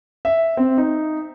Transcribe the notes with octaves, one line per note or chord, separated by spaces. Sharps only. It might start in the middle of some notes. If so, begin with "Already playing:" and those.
E5
C4
D#4